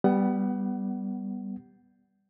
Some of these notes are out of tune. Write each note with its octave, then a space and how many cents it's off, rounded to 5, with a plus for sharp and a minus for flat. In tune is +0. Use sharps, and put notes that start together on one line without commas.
G3 +0 B3 +0 F#5 +30